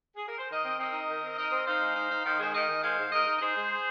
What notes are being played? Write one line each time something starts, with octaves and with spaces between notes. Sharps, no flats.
G#4
A#4
C5
D#3 A#4 D#5
C4
C4 A#4 D#5
D#4
D#3
C4
D#4 A#4 D#5
C4
D#4 C5 F5
G#3
D#4
D#4
D#3 C5 F5
G#3 G#4 C5
D#3 A#4 D#5
D#3
G#3 C5 F5
G#2
G#2 A#4 D#5
D#4
D#5
D#4 G#4 C5
G#3